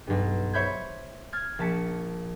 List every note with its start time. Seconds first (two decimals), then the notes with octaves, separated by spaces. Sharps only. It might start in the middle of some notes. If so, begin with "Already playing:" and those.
0.07 B1 G2
0.54 C5 C#5 E5 B5 G6 G#6
1.32 F6 G#6 A6
1.59 A#1 A5 B6 C#7